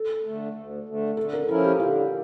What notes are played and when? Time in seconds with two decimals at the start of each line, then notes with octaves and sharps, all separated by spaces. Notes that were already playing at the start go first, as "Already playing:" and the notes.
Already playing: A4
0.23 D3 A3
0.55 D2
0.86 D3 A3
1.16 D3 A4
1.33 A#4
1.47 F3 C#4 E4 A4 A#4
1.64 G4
1.79 D3 F4